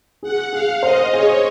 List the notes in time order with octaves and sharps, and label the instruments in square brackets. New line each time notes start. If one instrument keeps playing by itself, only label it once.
[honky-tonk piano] G#4 [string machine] F#5
[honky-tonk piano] G#4 [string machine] F5
[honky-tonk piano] C5 [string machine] D#5
[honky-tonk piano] G#4 [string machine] C#5